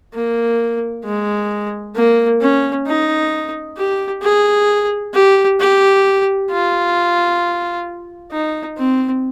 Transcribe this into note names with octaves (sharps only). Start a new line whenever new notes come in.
A#3
G#3
A#3
C#4
D#4
G4
G#4
G4
G4
F4
D#4
C4